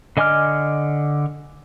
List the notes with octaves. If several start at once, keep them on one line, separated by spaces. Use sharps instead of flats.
D3 D#5 G#5 D6 F6